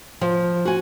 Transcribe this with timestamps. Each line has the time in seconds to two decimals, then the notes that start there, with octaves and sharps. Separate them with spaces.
0.21 F3
0.65 F#4 G#5